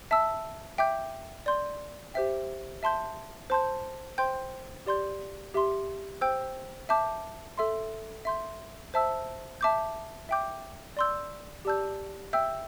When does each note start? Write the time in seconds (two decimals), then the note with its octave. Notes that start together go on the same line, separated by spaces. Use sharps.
0.11 E5 A5 E6
0.78 E5 G5 D6 G6
1.46 D5 C6 G6
2.14 G4 C5 E5 G5
2.83 E5 A5 C6 G6
3.50 C5 A5 C6 G6
4.18 C5 G5 C6 G6
4.86 G4 D5 C6 G6
5.54 G4 E5 C6
6.21 C5 G5 E6 G6
6.89 E5 A5 D6 G6
7.58 A4 E5 C6
8.25 E5 C6 G6
8.94 C5 E5 A5 E6
9.61 E5 A5 D6 G6
10.29 E5 G5 D6 G6
10.97 D5 C6 E6 G6
11.65 G4 D5 A5 E6 G6
12.33 E5 G5 E6 G6